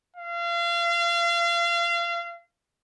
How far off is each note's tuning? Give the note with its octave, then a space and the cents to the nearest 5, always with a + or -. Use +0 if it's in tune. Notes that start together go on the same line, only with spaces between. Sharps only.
F5 -30